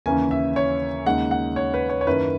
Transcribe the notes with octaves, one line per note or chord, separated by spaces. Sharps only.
D#2 C#3 E3 A#3 C#4 G#5
E5
C#5
D#2 C#3 G#3 D#4 F#5
F#5
C#5
B4
C#5
C#5
F#2 D#3 A#3 C#4 E4 B4